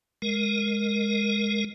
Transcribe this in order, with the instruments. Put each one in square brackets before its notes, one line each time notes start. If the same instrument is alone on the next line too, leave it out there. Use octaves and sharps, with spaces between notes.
[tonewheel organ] G#3 A#4